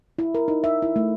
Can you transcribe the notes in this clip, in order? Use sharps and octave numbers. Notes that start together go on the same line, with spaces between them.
E4
A#4
D#4
E5
E4
A3